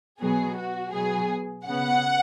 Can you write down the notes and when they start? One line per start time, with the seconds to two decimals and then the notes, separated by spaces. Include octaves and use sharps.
0.20 B2 F#3 B3 G#4
0.57 F#4
0.93 B2 F#3 B3 G#4
1.66 C#3 B3 F#5